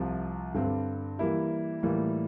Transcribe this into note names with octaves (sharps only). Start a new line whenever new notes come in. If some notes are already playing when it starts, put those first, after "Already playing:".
Already playing: C2 C3 F3
G2 D3 G3 C4
E3 G3 A#3 E4 G4
A2 E3 G3 A#3 F4